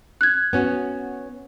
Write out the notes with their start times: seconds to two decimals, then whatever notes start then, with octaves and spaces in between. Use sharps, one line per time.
0.21 F#6 G#6
0.53 B3 C#4 F#4